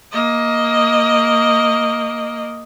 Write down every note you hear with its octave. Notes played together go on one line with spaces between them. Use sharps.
A#3 D#5